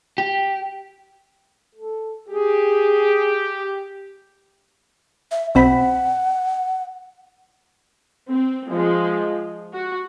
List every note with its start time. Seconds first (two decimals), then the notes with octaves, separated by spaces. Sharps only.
0.18 G4
1.75 A4
2.29 G4 G#4
5.31 E5
5.55 B1 C4 F#5 B5
8.28 C4
8.69 F3 G#3
9.73 F#4